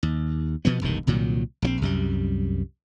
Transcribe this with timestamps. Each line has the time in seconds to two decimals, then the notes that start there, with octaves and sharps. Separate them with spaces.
0.03 D#2
0.65 B2 F3 B3
0.81 E1 C2 G2 D#3
1.07 C2 A#2 D#3 F#3
1.62 A#1 F3 C4
1.82 C2 F#2 G3